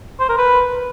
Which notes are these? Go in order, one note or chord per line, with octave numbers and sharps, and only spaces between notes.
C5
A#4
B4